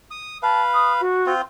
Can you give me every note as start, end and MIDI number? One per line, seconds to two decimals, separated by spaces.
0.11 0.38 87
0.43 1.01 71
0.43 1.01 77
0.43 0.62 81
0.74 0.92 87
1.00 1.31 66
1.26 1.41 60
1.26 1.41 65